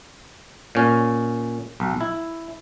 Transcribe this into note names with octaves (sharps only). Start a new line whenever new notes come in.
A#2 C#4
B1
E4